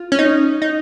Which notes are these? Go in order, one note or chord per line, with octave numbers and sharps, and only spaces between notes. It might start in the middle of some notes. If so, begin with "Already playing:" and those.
Already playing: F4
C#4
D#4
D#4